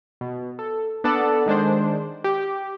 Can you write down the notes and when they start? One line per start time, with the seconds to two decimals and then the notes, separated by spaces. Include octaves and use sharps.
0.21 B2
0.59 A4
1.04 B3 D4 A4 D5 F#5
1.46 D#3 G#3 D4 C5
2.24 G4